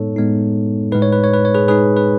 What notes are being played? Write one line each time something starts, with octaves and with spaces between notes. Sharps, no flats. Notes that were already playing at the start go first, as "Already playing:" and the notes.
Already playing: A2 G#3 B3 D#4 A4 C#5
A2 G#3 B3 D#4
A2 G#3 D#4 B4
C#5
B4
C#5
B4
C#5
G#4 B4
A2 G#3 D#4 G#4 B4
B4